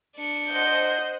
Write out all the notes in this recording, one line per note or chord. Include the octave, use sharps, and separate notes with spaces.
D4 C#7
C5 D#5 F#5 G6